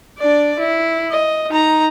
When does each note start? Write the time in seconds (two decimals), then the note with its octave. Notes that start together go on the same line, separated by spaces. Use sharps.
0.18 D4 D5
0.58 E4
1.11 D#5
1.50 D#4 A#5